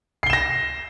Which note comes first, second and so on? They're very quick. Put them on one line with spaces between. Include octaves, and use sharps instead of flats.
C7 G7 E7 A#6